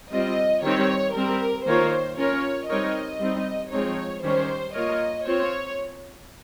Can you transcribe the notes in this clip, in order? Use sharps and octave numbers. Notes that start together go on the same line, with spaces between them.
G3 C4 F4 D#5
D#3 G3 C4 D#4 G4 C#5
G3 C4 G4 A#4
D#3 A#3 F4 A#4 C5 C#5
C#4 F4 A#4 C#5
G3 C4 D#4 A#4 C#5 D#5
G3 C4 D#4
F3 G#3 C4 D#4 C#5
D#3 G3 C#4 G4 C5 C#5
A#3 F4 A#4 C#5 D#5
C4 F4 C5 C#5